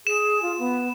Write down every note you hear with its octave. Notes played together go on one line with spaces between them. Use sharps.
G#4 E7
F4
B3